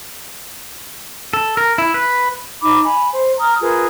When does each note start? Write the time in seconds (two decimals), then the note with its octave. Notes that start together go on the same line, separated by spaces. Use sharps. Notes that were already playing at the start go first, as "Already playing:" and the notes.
1.33 A4
1.57 A#4
1.78 E4
1.94 B4
2.62 D#4 B5 D6
2.84 G#5 B5
3.12 C5
3.39 A#5 D#6 F6
3.61 F4 G#4 A#4 B4